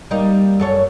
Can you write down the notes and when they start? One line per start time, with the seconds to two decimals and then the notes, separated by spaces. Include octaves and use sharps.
0.11 G3 A#3 D#4
0.60 F#2 A4 C#5